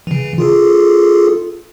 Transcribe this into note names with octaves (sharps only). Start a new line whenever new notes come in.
C#3 E3
F4 G#4 A4